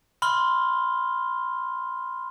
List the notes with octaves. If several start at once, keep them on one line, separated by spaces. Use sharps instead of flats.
B5 C6 F6 G7